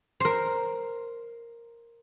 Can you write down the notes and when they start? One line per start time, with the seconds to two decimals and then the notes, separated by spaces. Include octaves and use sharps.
0.20 A#4 C5